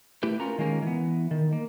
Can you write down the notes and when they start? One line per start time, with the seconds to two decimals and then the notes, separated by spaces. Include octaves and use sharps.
0.23 A3 E4 G4 B4
0.40 C#4 F4 A#4 A#5
0.58 D#3 G#3 A#3 C#4 A#4
0.82 E3 B3
1.31 D#3
1.53 A#3